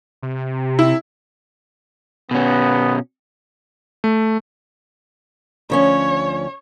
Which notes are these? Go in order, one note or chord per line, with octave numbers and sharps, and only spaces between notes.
C3
E4
B2 B3 C#4
A3
D2 F3 C#4 C#5